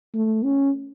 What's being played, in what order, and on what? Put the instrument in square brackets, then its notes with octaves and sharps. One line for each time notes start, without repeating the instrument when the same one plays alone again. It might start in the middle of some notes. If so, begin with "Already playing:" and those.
[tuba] A3
C#4